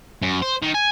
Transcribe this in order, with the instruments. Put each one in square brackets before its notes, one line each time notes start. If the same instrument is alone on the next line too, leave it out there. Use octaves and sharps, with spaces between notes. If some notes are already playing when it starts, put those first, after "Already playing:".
[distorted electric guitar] F#2
C5
D#3
G#5